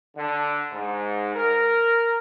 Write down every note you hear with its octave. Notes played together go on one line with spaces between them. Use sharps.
D3
G#2
A#4